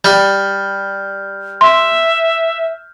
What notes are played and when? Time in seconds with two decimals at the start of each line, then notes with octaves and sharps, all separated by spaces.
0.04 G3 F6 G6
1.61 E5 C6